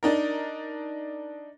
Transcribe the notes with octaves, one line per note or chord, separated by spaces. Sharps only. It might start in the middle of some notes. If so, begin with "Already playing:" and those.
D4 D#4 A#4